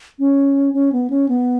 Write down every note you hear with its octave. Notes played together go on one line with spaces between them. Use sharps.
C#4
C#4
B3
C#4
B3